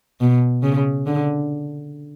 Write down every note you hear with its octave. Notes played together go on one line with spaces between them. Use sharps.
B2
C#3
D3